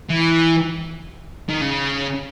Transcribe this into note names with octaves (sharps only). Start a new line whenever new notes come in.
E3
D#3
C#3